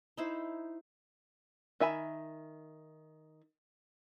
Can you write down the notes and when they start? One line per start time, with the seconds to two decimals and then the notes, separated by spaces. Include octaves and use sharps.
0.17 D#4 E4 C5
1.80 D#3 E5 G#5 B5